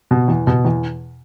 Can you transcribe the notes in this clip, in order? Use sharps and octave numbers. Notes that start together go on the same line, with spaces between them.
B2
E2
B2
E2